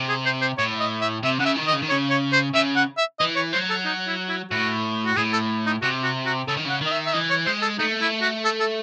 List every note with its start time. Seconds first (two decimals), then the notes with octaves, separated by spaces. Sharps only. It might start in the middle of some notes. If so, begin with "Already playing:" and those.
Already playing: C3
0.09 G#4
0.25 C5
0.42 C5
0.58 A2 C#5
0.80 D#5
1.01 E5
1.23 C3 E5
1.39 C#3 F#5
1.45 E5
1.56 D#3
1.67 D#5
1.73 C#3
1.82 D#3
1.90 C#3 C#5
2.10 C#5
2.33 C5
2.54 C#3 E5
2.76 F#5
2.98 E5
3.19 E3 D#5
3.36 C#5
3.53 F#3 C5
3.70 A4
3.85 D#4
4.08 E4
4.29 E4
4.51 A2 F#4
5.06 F#4
5.17 A2 G#4
5.33 A4
5.66 D#4
5.82 C3 F#4
6.03 F#4
6.26 F#4
6.48 C#3 A4
6.57 D#3
6.65 C#3 F#5
6.81 D#3
6.86 D#5
6.92 E5
7.06 E5
7.14 E3 D#5
7.30 C#5
7.46 G#3 C5
7.62 A4
7.78 A3 D#4
8.01 E4
8.22 F#4
8.45 A4
8.60 A4